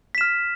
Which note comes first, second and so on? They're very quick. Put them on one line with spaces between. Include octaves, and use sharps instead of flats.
B6 E7 F6